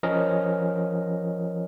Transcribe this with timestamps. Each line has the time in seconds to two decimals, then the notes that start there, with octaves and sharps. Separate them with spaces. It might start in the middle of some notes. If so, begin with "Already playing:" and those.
0.03 F3 C#4 A#4 D#5